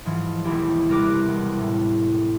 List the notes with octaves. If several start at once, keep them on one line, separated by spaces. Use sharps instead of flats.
G#2 E3 F3
E1 D#2 E3 E4 G4
C3 G3 A#4 B4 D6 F#6
E1
A2